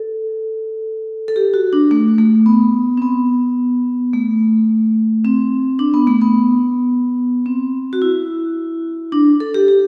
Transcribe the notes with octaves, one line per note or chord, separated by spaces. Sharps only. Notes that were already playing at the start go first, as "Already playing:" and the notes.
Already playing: A4
A4
G4
F#4
D4
A3
A3
B3
C4
B3
A3
C4
D4
B3
A3
B3
C4
F#4
E4
D4
A4
G4
G4